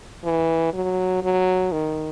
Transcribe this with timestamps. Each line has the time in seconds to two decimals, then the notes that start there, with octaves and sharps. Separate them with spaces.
0.24 E3
0.74 F#3
1.23 F#3
1.72 D#3